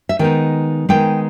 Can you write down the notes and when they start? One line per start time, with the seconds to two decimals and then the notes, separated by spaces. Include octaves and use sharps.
0.09 E5
0.19 D#3 G#3 B3 D#4 G5
0.89 D#3 G#3 B3 D#4 G5